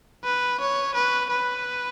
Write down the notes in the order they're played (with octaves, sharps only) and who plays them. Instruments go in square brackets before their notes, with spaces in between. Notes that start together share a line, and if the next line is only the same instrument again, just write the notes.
[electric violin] B4
C#5
B4
B4